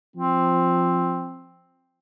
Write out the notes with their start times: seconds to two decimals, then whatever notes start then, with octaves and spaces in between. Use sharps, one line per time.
0.16 F3 C4